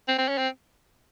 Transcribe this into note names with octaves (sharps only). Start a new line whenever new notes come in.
C4
C4
C#4
C4